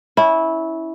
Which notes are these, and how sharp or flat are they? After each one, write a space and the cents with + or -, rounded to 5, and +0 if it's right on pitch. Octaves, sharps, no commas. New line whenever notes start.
C#4 +10 E4 -15